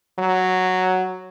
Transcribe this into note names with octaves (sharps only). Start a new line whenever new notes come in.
F#3